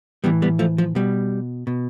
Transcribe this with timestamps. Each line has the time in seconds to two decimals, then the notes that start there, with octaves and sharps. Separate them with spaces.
0.24 A2 E3 G3 B3
0.42 G3 B3
0.59 F3 A3
0.78 F3
0.95 B2 G3
1.67 B2